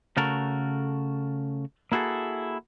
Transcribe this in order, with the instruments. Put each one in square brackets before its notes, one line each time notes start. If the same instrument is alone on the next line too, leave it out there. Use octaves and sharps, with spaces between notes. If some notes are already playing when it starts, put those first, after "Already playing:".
[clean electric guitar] C#3 A3 F#4 A4 A#4
A#3 E4 F#4 G#4 A4